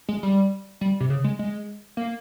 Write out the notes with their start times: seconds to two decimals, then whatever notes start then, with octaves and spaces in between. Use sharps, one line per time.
0.09 G#3
0.23 G3
0.81 G3
1.00 C3
1.10 C#3
1.24 G#3
1.39 G#3
1.97 A#3